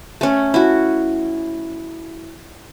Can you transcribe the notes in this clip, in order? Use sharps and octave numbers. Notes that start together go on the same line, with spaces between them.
A3 C#4
E4 F#4